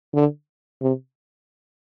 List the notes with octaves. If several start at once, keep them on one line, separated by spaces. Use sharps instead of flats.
D3
C3